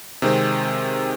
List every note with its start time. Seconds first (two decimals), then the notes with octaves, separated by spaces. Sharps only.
0.22 C3 D#3 G#3 C4